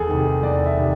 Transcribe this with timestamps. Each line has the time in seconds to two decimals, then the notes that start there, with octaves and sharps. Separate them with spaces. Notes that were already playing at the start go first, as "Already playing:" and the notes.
Already playing: E2 G#4 A4
0.09 C3 D#3
0.43 E2 D5
0.66 E5
0.77 C3 D#3